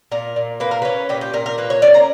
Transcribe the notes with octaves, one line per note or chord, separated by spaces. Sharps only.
A#2 A#4
A#2
A#3 B4
A#4
C#4 B4
A#2 G4
G4
A#2 A#4
A#4
A#3 B4
C#5
C#4 D5
A#5